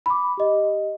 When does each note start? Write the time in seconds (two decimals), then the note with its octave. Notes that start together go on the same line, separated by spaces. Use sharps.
0.06 B5 D6
0.37 G4 D#5